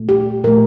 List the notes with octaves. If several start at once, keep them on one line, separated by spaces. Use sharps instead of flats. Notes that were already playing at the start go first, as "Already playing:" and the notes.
Already playing: A#2 A3
G4
A#2 A3 A#4